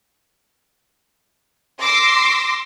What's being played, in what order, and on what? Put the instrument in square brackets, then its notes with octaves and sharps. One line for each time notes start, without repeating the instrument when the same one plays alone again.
[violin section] C6 D6 E6 A#6 C7